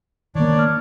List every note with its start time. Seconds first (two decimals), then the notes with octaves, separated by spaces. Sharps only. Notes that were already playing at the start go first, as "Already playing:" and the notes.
0.35 D#3 A#3 D4 C#5 D5
0.59 F6